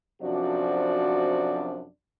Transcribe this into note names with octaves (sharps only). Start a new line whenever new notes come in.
F#2 C3 F3 D4 F#4 D5